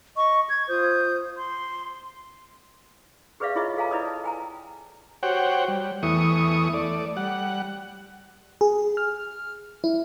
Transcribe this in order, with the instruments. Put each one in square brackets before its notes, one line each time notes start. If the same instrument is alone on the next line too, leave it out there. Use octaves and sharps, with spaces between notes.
[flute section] D#5 C#6
G#6
F4 C5 D#6 G6
C6
[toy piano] G4 G#4 B4 D5 E5 F5
E4 F4 G#4 C#5 D#5 E5
A4 F5 G#5 A#5
E4 B4 D5 D#5 D#6
A5
G5 G#5 A#5
[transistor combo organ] F#4 G4 C5 C#5 F#5 G5
G3
E2 E3 A3 C#6 D#6
A3 D5
G3 F#5
[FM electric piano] G#4
F6
E4